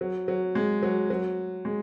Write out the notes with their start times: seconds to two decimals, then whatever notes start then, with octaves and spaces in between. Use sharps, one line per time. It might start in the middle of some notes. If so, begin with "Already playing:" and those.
0.01 F#3
0.28 F#3
0.55 G#3
0.83 F#3
1.10 F#3
1.65 G#3